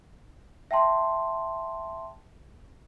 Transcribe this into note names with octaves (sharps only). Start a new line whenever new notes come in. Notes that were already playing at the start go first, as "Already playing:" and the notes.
E5 G5 A5 C6